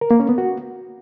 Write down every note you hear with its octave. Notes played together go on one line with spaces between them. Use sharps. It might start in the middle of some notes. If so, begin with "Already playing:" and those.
A#4
A#3
C#4
B3
F#4